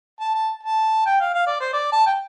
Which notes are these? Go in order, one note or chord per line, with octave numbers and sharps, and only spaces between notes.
A5
A5
A5
G5
F5
F5
D5
C5
D5
A5
G5